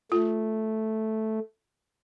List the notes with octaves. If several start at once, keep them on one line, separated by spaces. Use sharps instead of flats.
A3 F4